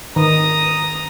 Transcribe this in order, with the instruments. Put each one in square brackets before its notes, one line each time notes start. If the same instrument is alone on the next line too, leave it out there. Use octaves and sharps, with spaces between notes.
[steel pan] D#3 [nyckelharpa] A#5 D#6